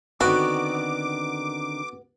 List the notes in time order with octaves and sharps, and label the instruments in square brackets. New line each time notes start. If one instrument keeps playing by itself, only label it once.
[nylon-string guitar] D3 D#3 C4 [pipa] B3 [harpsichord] F#4 [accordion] D6